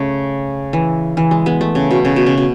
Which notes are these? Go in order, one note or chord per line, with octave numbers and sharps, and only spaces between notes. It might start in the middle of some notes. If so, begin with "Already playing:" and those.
Already playing: C#3 A3
E3
E3
G#3
G#3 B3
A3
C#3
B2
C#3
B2
C#3
B2